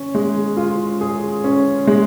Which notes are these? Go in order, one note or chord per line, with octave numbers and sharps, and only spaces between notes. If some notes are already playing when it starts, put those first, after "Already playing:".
Already playing: C#4
G#3
F4
G#4
C#4
G#3